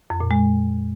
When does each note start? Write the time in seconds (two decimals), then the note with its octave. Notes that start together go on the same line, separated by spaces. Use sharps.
0.10 F2
0.20 A#2
0.31 G#3